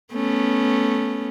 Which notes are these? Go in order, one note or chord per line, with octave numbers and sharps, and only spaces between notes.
A3 B3 C#4